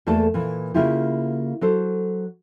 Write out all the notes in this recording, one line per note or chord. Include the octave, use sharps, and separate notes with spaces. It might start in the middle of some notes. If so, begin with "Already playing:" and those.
E2 A3 A#3 A4 D5 A5
A#2 E3
C#3 A#3 E4 F4 G4
F#3 A4 C5